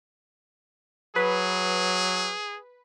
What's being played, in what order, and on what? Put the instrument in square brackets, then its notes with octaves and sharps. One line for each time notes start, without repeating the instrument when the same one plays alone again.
[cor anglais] F#3 [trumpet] G#4 [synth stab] B4